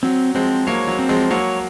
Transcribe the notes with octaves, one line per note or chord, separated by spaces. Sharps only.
F#3 C4
F3 G#3 C4
F#3 A#3 C#5
F#3
C4
F3 G#3
F#3 A#3 C#5